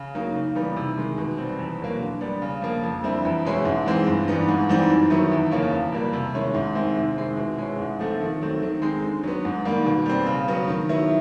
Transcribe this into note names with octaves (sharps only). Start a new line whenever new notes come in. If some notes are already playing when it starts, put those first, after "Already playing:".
Already playing: C#3
F#3 A#3 D#4
C#3
E3 G3 B3 D#4
C3
D#3 G#3
B2
G3 C4
E2
B2 F#3 A#3
D3
G3 B3 D4
C#3
F3 A#3
F2
D3 G3 C4 E4
E2
B2 G#3 C#4 E4
G#2
E3 G#3 C4
G2
E3 G3 B3 D#4
G#2
E3 G3 C4 D#4
F#2
D#3 F#3 B3 E4
E2
C#3 F3 A#3 C#4
E2
B2 G3 A#3
C3
D#3 G#3 C#4 E4
G#2
D#3 G#3 C4 E4
C3
D#3 G#3 C4 E4
B2
G#3 C#4 E4
G#2
F3 A3 C4
D#3
F#3 A3 C4
D#3
G#3 C4 D#4
D3
F#3 B3
G#2
D#3 G3 A#3
B2
G3 C4
C#3
F#3 B3
D#3
F#3 B3 E4